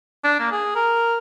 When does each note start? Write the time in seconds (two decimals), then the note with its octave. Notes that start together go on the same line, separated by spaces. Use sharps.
0.24 D4
0.40 A#3
0.52 G#4
0.75 A#4